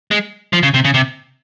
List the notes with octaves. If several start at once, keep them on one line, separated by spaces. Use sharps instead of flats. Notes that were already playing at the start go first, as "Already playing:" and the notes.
G#3
F3
C#3
C3
C#3
C3